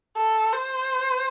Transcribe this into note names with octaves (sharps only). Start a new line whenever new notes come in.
A4
C5